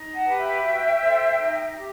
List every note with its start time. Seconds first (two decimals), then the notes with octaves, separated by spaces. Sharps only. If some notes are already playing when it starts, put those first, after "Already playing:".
Already playing: D#4
0.14 F#5 A5
0.26 G4 B4
0.39 E5 G5
0.64 F#4
1.01 A4 C5
1.39 D#4
1.77 G4